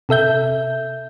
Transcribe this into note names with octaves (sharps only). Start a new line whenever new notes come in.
C3 A4 E5 G6